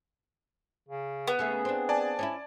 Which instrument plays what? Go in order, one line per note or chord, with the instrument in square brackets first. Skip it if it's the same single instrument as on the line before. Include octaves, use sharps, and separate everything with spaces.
[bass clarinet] C#3
[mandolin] B3
[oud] C#3 A3 A#3 [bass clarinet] G#4
[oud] C4 D4
[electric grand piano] D5 G#5 A5
[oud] C#4 D#4 E4